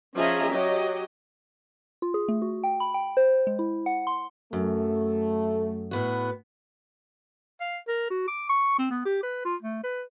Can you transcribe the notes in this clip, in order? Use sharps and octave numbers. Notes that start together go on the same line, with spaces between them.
F3 C#4 G#4 D#5 E5 A#5
F#3 G4 D#5
F4
G#4
A3
F#4
G5
B5
G5
C5
G#3
E4
F#5
C6
F#2 A3
A2 B3 F#4
F5
A#4
F#4
D6
C#6
C4
B3
G4
B4
F4
A3
B4